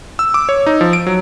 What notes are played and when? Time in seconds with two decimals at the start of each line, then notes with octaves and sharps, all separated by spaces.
0.19 E6
0.34 D6
0.49 C#5
0.66 D#4
0.81 F3
0.93 D7
1.07 F#3